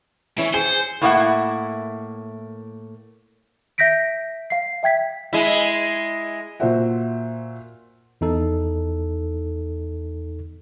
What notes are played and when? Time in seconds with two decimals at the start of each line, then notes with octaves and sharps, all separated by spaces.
0.38 E3 C#4 E4
0.54 G#4 C5 G#5 C#7
1.02 A2 A#3 E4 F4 E5 F#5
3.78 E5 G6 A#6 B6 D7
4.50 F5 C7
4.83 E5 G5 G#6 B6
5.33 G#3 E4
6.60 A#2 F4 F#4 C5 E5 F#5
8.21 E2 D#4 A4